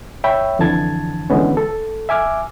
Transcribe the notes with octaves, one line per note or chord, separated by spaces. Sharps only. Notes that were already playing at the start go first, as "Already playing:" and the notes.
C#5 E5 G5 B5
F2 D3 E3 A5 G#6
D#2 D3 E3 G#3 B3 C#4
A4
E5 G#5 D6 F6